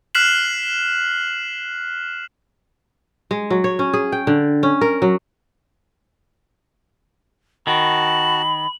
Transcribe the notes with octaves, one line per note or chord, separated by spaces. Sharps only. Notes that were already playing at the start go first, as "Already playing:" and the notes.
F6 F#6 B6 C7 E7 F#7
G#3
F#3
C#5
C#4
G#4
G5
D3
C#4
A#4
F#3
D#3 F#4 A5 B5 F#7